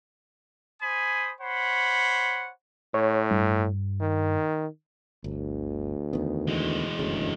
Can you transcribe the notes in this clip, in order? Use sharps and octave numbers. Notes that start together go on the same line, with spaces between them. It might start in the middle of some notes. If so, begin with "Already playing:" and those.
C5 G#5 B5 D#6
C5 C#5 F#5 B5
A2 C#5
G2
D#3
G1 D2
E2 D#3 B3
E3 G#3
F#1 D2 G2 C#3